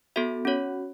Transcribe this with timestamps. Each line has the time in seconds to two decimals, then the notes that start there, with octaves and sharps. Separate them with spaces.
0.16 B3 F#4 A4 E5
0.45 C#4 F#4 C#5